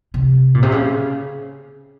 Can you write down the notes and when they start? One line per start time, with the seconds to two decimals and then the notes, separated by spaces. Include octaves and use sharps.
0.14 C3
0.54 A#2
0.63 C3
0.72 C#3